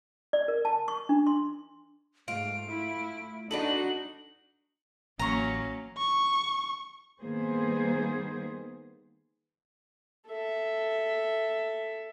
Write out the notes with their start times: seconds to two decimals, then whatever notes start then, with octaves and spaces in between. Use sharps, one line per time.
0.33 D5
0.48 A#4
0.65 A5
0.88 C#6
1.09 D4
1.27 C6
2.28 G#2 A3 F4 D7
2.68 E4
3.51 D4 D#4 F#4 A4 B4 D5 D#5 F#7
5.19 A1 F#3 A#3 C#4 A#5 C#6
5.98 C#6
7.21 D#3 G3 A#3 B3 G#4 C5
10.28 A4 E5